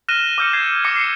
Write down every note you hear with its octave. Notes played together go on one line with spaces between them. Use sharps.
F6 F#6 A#6 D#7 E7 G7
D6 E6 F6 G6 A#6 C#7
G6 G#6 C7
D6 F6 A#6 C#7
C7 C#7